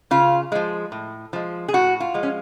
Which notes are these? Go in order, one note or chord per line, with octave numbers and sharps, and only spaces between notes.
C#3 F4
F3 G#3
A2
F3 G#3
G#4
A2 F#4
F4
F3 G#3
C#4